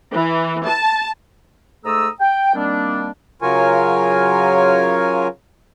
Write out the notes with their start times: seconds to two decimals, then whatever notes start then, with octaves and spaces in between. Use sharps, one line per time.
0.13 E3
0.66 A5
1.84 G#2 A3 A4 A#5 D#6 E6
2.20 G5
2.55 D#3 G3 A#3 C4 D4
3.42 C#3 F#3 F4 A#4 C#5 G#5